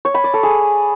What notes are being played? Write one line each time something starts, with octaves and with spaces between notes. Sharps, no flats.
C#5
B5
D5
A4
G#4